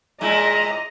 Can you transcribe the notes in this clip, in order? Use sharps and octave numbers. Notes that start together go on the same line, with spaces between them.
A#2 G#3 E4 D#5 A#5